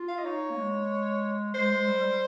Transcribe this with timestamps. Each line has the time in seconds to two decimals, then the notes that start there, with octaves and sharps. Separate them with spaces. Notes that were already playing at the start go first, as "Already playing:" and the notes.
Already playing: F4
0.08 F5
0.19 D#5
0.25 D#4 C#5
0.50 A#3
0.57 G#3
1.54 G#3 C5
1.71 G#3
1.87 G3
2.03 G3